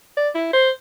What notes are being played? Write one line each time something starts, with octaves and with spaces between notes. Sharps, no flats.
D5
E4
C5